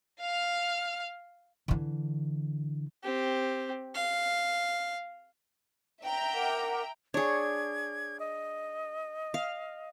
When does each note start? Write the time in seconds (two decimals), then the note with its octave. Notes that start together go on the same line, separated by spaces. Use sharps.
0.21 F5 F6
1.68 D3 E3
3.04 C4 G4
3.95 F5
6.03 E5 G5 A#5
6.32 A#4 F#5 D6
7.14 D4 G#4 C#5 G#6
8.20 D#5
9.34 F5